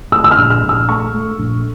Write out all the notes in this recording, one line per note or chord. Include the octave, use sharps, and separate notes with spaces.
A3 E6
E6
F6
A#1
F6
A#1
E6
A3 C#6
A3
A#1